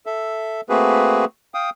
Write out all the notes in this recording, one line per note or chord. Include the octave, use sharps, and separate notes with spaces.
A4 E5
A3 A#3 C4 F#4 G#4 B4
F5 G5 D#6